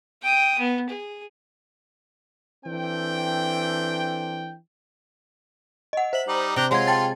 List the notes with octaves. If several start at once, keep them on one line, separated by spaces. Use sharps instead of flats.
G5 D#6
B3
G#4
E3 C4 D4 A4 G5
D#5 F#5
C5 E5 F#7
G3 D#4
C3 D4 G5 A#5
G#3 F4 C#5 F#5 A#5 C6 G#6
G5 A5 A6